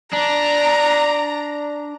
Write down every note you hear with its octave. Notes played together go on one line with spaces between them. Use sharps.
D4 A#5